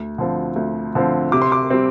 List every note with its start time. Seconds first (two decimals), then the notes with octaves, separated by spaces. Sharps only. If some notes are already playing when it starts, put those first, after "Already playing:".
Already playing: D2
0.18 D3 F3 C4
0.56 D2
0.95 D3 F3 C4
1.32 C3 D6
1.42 C6
1.52 D6
1.70 G3 C4